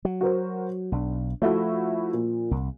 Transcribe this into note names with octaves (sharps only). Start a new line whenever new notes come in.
F#3
F#4 A#4 C5
B1 D4
F3 A3 E4 F#4
A#2
C2